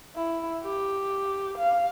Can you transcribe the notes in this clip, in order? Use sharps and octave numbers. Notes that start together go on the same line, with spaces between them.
E4
G4
F5